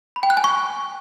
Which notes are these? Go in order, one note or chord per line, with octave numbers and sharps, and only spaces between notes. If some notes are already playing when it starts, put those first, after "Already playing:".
B5
G5
F#6
G#5
C#6